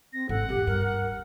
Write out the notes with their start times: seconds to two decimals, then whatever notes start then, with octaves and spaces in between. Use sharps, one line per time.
0.13 C4 A#6
0.29 G#1 A4 F#5
0.49 A#1 E2 G4
0.67 G2 A#4